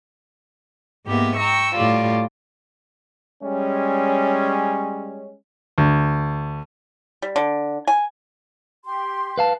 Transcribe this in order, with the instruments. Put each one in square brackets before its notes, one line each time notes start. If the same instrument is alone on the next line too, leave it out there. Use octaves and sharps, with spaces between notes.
[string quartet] G#2 A#3 B3 G4 E5
G5 A#5 C#6 E6
A2 G3 F4 D5
[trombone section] G3 G#3 C#4
[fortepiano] D2
[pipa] G3
D3
G#5
[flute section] G4 C6
[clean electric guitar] B4 F5 A5